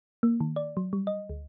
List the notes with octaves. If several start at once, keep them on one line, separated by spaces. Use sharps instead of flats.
A#3
D#3
D5
F#3
G3
D#5
D2